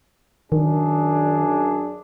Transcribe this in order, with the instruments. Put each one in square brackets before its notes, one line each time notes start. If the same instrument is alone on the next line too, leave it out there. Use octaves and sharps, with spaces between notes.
[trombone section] F#2 D4 G#4 [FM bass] D#3